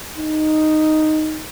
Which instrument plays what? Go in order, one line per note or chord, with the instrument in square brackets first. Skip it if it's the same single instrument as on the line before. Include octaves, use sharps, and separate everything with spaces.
[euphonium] D#4